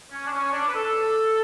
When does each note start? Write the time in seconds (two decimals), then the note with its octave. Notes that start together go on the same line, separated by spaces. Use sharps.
0.11 C#4
0.26 D4
0.31 C#4
0.52 D4
0.68 B4
0.73 A4